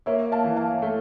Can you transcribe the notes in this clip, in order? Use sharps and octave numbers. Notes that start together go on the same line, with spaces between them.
A#3 C#5 E5
F5 A5
E3
F5 A5
A3